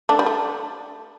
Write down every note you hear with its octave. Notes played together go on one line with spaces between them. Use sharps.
A3 D4
G3
A3